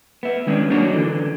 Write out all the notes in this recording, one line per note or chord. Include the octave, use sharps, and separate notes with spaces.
B3 E5
D#3 G#3 C#4 D4
F#3 A#3 D4 D#4 F#4 C#5
D3 E3